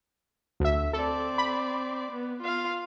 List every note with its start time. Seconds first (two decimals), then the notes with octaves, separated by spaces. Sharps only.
0.60 D2 E5
0.93 C4 A4 D5
1.38 B5
2.11 B3
2.42 F4 F5